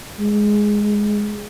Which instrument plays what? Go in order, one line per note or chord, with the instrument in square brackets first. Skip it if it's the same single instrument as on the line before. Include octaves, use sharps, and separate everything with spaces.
[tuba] G#3